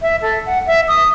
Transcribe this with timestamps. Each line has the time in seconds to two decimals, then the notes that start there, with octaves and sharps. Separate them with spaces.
0.01 E5
0.22 A4
0.46 F#5
0.66 E5
0.88 D#6